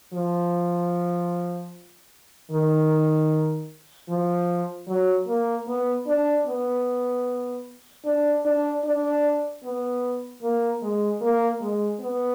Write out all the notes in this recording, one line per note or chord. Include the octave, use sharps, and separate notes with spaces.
F3
D#3
F3
F#3
A#3
B3
D4
B3
D4
D4
D4
B3
A#3
G#3
A#3
G#3
B3